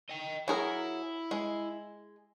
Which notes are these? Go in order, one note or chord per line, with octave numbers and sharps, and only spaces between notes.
D#5 G5
F#3 E4 G#4 A#4
G#3